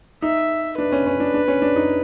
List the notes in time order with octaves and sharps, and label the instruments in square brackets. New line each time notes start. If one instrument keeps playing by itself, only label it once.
[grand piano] D#4 [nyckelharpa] E5
[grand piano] D4 [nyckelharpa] B4
[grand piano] C#4
C#4
D4
D4
C#4
D4
D#4